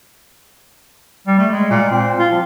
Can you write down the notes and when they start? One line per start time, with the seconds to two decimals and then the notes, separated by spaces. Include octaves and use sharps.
1.27 G3
1.39 A3
1.52 G#3
1.70 A#2
1.91 C4
2.19 F4
2.31 F3